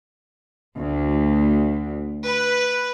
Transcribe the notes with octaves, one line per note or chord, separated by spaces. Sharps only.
D2
B4